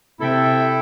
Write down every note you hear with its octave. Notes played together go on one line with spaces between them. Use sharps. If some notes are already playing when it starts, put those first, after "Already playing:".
C3 E4 A4 E5 G5